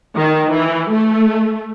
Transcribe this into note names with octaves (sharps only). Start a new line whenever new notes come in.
D#3
E3
A3